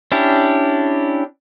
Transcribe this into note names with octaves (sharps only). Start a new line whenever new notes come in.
C#4 D4 E4 G4